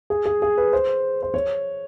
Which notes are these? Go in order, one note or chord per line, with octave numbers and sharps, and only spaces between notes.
G#4
G#4
G#4
B4
C5
C5
C#5